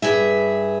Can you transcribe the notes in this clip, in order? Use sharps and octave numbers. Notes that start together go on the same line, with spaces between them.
G2 G#4 E5